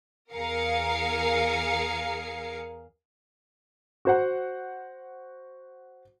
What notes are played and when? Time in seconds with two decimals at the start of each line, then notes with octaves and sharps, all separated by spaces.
0.33 E2 G#4 A#4 F5 C7 C#7
4.05 F#4 C5 F#5